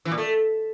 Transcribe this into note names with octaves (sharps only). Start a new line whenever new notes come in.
E3
A#2
A3